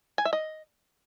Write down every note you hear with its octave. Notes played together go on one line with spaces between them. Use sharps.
G#5
E5
D#5